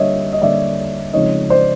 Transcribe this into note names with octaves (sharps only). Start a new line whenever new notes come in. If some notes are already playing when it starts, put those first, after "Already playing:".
Already playing: D3 G3 A#3 D4 C#5 D#5 E5
D#5
D3 G3 A#3 D4 D5 E5
C#3 F3 G#3 C4 D#4 C#5 D#5
C5 D5